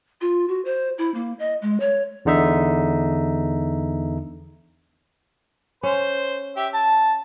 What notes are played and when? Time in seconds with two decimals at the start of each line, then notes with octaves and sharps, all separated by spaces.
0.21 F4
0.48 F#4
0.65 C5
0.98 E4
1.14 A#3
1.39 D#5
1.62 G#3
1.80 C#5
2.25 E2 D3 D#4 E5
5.83 C#4 C5
6.57 G4 E5
6.74 A5